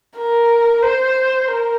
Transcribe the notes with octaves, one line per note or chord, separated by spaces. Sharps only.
A#4
C5
A#4